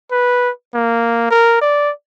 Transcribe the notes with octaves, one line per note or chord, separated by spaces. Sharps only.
B4
A#3
A#4
D5